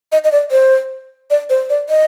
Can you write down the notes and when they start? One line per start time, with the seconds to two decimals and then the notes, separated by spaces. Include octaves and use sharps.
0.12 D#5
0.24 D#5
0.32 D5
0.51 C5
1.30 D5
1.50 C5
1.69 D5
1.89 D#5